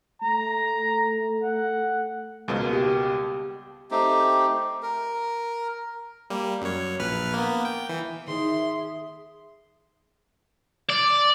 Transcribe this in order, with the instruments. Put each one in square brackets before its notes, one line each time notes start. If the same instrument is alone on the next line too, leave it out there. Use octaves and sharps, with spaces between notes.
[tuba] A3 [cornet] A#5
[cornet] F#5
[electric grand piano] C#2 B2 [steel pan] G#3 A#3
[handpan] G4
[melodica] A3 C4 D#4 G4
A#4
[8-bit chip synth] G3 A#3
F#2 C#5
A#1 B4 F6
A#3 B3
G5
E3
[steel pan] D#3 [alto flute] G#4 [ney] E5 [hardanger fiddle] C6
[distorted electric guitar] D5